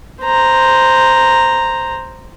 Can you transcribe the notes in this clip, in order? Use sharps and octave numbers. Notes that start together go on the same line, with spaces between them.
C5 A#5